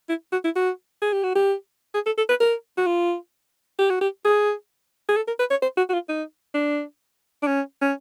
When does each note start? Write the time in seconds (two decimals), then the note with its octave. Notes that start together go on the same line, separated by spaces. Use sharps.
0.09 E4
0.32 F#4
0.44 E4
0.56 F#4
1.02 G#4
1.13 G4
1.23 F#4
1.35 G4
1.94 G#4
2.06 A4
2.18 A4
2.29 B4
2.40 A#4
2.77 F#4
2.87 F4
3.79 G4
3.90 F#4
4.01 G4
4.25 G#4
5.09 G#4
5.16 A4
5.28 A#4
5.39 B4
5.51 C#5
5.62 C5
5.77 F#4
5.90 F#4
5.93 F4
6.09 D#4
6.54 D4
7.43 D4
7.47 C#4
7.82 C#4